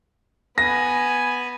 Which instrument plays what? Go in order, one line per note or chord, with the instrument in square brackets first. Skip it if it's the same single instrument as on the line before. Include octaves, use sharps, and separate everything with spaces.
[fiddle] B3 G#5 [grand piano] A#6